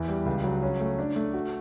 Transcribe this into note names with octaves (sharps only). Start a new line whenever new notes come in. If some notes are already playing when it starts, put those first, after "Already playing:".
Already playing: E2 E4
G3
C#2
F#3
C#4
A3
D4
A3
F#4